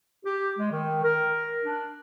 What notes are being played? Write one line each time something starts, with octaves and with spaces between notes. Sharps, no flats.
G4
G#3
D#3
A#4
D4